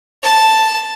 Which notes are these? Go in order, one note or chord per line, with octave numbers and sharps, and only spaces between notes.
A5